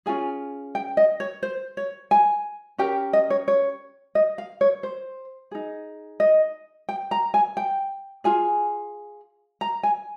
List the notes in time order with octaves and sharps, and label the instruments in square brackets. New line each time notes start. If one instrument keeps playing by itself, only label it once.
[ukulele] C#4 F4 G#4 G#5
G5
D#5
C#5
C5
C#5
G#5
C#4 G4 A#4 G5
D#5
C#5
C#5
D#5
F5
C#5
C5
D#4 G#4
D#5
G5
A#5
G#5
G5
F4 G#4 G#5
A#5
G#5